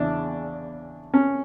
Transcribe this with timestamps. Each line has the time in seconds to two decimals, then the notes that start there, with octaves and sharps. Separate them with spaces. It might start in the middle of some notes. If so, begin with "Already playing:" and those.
Already playing: E2 C#3 E3 D4
1.14 C#4